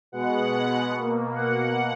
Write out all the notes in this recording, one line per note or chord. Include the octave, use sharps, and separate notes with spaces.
B2 G#3 B3 F#5
B2 A#3
F#5